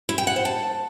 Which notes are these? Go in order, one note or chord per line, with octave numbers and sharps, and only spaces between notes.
E4
G5
F#5
C5
A5